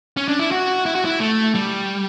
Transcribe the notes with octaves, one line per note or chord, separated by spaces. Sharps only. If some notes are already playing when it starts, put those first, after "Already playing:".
C#4
D4
E4
F#4
E4
F#4
E4
A3
G3